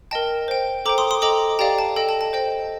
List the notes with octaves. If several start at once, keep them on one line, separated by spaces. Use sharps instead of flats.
A#4 D#5 G5 A5
C5 G5
A4 C5 G5 A#5 D6
C6 D#6
C6 D#6
A4 D#5 G5 A#5 D6
G4 D5 F5 G5 A#5
A5
A4 D#5 G5
A5
A5
C5 D#5 G5